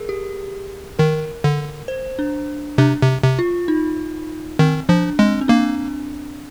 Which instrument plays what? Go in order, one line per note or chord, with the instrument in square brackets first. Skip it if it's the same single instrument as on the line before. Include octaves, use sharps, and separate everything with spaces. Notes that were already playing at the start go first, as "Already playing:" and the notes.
Already playing: [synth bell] G#4 A#4
G4
[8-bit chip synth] D#3 [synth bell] A#4
[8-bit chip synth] D3
[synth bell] C5
D4
[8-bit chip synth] C3 [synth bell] D4
[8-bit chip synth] C3
C3
[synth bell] F4
D#4
[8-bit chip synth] D#3 [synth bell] C4
[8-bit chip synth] F3 [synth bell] D4
[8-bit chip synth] G#3 [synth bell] C4
[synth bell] C4
[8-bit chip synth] A#3 [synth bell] D4